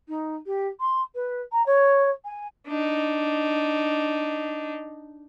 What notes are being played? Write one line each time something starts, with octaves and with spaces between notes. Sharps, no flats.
D#4
G4
C6
B4
A#5
C#5
G#5
D4 D#4